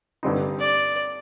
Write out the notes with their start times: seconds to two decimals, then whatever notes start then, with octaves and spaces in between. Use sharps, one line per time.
0.23 G2 D3 G3 C4 D#4
0.60 D5